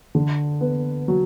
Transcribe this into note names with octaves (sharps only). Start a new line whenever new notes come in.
D3
B3
F#3